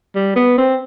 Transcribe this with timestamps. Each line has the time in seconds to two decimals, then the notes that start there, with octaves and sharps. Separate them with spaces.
0.15 G3
0.36 B3
0.58 C4